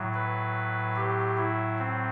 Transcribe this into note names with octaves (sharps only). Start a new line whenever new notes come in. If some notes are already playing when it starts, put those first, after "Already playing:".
Already playing: A2 F#3
B4
G4
E4
C4